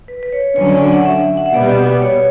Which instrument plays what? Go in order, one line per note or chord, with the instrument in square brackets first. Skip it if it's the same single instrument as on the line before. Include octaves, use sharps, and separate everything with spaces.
[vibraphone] B4
B4
C#5
[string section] D3 F#3 C#4 [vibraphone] C#5
[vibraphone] D5
D5
F#5
E5
F#5
E5
[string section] B2 G3 B3 [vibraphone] D5
[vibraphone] C#5